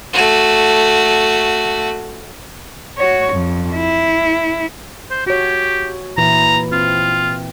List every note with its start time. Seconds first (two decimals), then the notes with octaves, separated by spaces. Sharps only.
0.13 A3 F#4
2.98 F#4 C#5
3.33 F2
3.75 E4
5.10 C5
5.26 F#4 G4 C#5
6.18 A#2 E3 E4 A#5
6.72 C4 F4